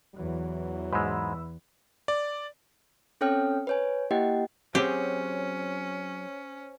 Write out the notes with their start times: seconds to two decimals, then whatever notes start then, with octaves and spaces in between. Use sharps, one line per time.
0.15 E2 E3 F#3
0.93 G#2 G#3 B5 E6
2.08 D5
3.21 C4 C#4 A4 C#5 G5 F6
3.67 B4 C#5 G#5
4.11 A#3 E4 G4 D#5 F#5 G5
4.75 F#3 C4 C#4 G4 G#4 C5 C#5